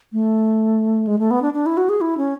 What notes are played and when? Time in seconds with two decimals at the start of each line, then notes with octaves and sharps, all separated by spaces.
0.13 A3
1.07 G#3
1.19 A3
1.31 B3
1.42 D4
1.54 D4
1.66 E4
1.77 F#4
1.89 G#4
2.01 E4
2.17 C#4